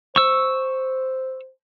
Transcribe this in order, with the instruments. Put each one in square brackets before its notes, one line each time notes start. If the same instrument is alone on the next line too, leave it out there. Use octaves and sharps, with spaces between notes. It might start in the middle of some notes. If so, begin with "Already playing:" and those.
[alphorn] C5 [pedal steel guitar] C#6 E6